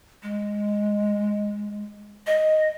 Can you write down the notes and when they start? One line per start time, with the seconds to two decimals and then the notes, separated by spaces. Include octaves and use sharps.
0.23 G#3
2.27 D#5